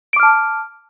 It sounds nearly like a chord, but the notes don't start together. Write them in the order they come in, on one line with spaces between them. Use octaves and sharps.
D7 D6 F6 A5